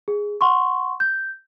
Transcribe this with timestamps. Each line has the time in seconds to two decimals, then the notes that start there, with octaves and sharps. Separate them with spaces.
0.08 G#4
0.41 F#5 C6 C#6
1.00 G6